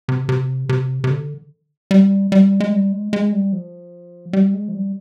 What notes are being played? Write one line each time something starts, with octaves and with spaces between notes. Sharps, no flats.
C3
C3
C3
C3
D3
G3
G3
G#3
G3
G#3
G#3
G3
F3
G3
G#3
F3
G3